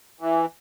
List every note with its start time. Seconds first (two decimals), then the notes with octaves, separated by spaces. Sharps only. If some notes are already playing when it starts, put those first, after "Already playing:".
0.21 E3